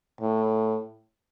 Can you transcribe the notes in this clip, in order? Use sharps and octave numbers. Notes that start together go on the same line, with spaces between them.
A2